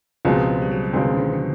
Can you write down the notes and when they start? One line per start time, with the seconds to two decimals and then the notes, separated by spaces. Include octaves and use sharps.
0.25 C#2 B2 F3 G#3 C4
0.62 G3
0.71 F#3
0.93 C#2 B2 D#3 G#3 C4
1.13 C#3
1.17 D3
1.33 D3